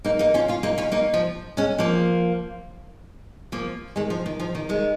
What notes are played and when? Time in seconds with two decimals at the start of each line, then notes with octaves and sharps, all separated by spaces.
0.04 A#3 D#4
0.19 A#3 D#4
0.34 C#4 F4
0.48 C#4 F4
0.63 A#3 D#4
0.78 C#4 F4
0.92 A#3 D#4
1.14 F3
1.57 G#3 C#4
1.79 F3 A#3
3.52 F3 A#3
3.96 D#3 G#3
4.10 F3
4.26 D#3
4.40 F3
4.55 D#3
4.69 D#3 G#3